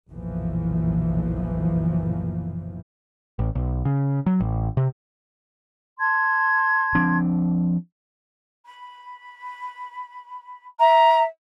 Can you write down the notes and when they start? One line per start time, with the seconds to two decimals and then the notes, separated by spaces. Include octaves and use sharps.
0.11 F#1 B1 A#2 E3 F3
3.39 A1
3.55 B1
3.85 C#3
4.26 F#3
4.40 A1
4.77 C3
5.99 A5 C6 G#6
6.95 F3 C4 D4
8.65 B5
10.79 E5 A#5